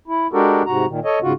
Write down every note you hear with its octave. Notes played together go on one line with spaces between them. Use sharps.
E4
G#3 D4 F#4 G4 A4 A#4
G#2 C3 F#4 A#5
A#2 D#3
A4 C#5 D#5
G#2 C#3 F4 F#4